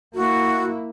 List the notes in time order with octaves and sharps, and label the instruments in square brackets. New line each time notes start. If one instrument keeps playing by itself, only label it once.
[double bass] A#3 E4 [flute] F#4